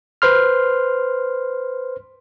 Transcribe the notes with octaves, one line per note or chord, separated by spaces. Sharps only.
B4 C5 C6 F6